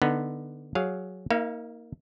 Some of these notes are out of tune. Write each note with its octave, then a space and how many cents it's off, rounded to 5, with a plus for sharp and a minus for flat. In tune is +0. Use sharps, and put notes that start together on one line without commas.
D3 +10 B3 +0 D#4 +0
F#3 +0 G#4 +0 F5 +0
A#3 +0 D#4 +35 F5 -40